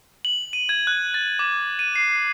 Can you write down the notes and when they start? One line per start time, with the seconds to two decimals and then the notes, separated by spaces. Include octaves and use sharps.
0.25 F#7
0.53 D#7
0.69 G#6
0.87 F#6
1.14 A6
1.39 D6
1.79 D#7
1.96 C7